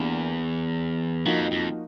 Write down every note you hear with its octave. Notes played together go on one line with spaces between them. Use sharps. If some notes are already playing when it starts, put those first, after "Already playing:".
Already playing: E2 A#3 D4 G4 A#4
F2 F3 A#3 D#4 F#4 A#4
F2